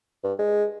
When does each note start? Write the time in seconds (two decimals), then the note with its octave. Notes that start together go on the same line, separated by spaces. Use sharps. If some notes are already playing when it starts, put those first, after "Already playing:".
0.24 G2
0.38 G#3